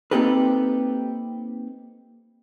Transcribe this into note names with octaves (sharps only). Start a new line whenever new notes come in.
A#3 C4 D#4 G4 A4 B4